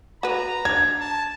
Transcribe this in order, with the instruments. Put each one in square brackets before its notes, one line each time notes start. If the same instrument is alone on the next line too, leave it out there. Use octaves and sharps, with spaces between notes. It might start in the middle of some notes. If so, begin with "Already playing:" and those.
[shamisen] F#4 B4 [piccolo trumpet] A#5
[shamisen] D4 [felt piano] G#6
[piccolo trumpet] A5